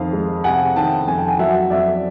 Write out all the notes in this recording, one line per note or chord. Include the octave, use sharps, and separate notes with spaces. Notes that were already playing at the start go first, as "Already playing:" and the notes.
Already playing: F2 D#3 F5
G#3
C3 F#5 G#5
D#3 G5 A5
F2 G#5
G5
F#5 G#5
F#3 E5 F#5
F2 D5 E5